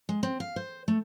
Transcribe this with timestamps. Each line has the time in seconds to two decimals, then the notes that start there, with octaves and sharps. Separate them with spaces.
0.09 G#3
0.23 C4
0.40 F5
0.56 C5
0.88 A3